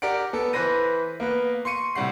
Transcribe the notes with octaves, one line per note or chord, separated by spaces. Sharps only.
G4 A#4 D5 F#5 D7
B3 A4
E3 B4 C5 B5 A#6 D#7
A#3 B3 B4
C6 C#6 C#7 D#7
A2 C3 G3 F#5 C7